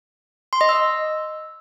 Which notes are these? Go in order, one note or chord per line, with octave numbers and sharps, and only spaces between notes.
C6
D#5
E6